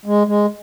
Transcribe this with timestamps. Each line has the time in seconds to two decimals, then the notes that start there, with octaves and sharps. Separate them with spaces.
0.05 G#3
0.27 G#3